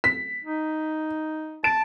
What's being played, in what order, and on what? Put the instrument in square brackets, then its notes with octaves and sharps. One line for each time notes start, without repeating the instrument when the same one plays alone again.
[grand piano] B6
[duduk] D#4
[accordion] A5 [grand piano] D7